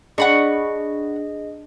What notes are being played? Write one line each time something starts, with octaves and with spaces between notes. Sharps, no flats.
D4 G#4 D#5 F#5 B5 C#6